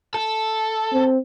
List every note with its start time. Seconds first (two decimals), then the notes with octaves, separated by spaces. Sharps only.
0.14 A4
0.92 C4